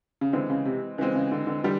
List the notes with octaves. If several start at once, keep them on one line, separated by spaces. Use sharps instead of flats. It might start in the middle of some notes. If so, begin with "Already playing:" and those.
C#3
D3 E3 G#3 C4
C#3
C3
C#3 E3 G#3 C4
C#3
D3
D3
D3 E3 G3